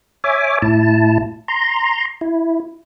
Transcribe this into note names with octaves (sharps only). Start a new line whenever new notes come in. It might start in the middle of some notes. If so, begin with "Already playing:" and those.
C#5 E5 G#5 D6
A2 E4 A5
A#5 C6
E4